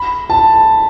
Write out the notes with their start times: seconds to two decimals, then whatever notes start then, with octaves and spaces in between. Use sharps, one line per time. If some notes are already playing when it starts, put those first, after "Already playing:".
Already playing: B5
0.30 A5